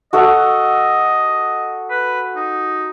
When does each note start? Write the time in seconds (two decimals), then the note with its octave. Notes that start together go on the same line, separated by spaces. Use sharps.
0.13 F#4 A4 D#5 F#5
1.90 B4
2.36 D#4